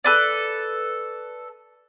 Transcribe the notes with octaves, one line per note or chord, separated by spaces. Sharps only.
A4 B4 D5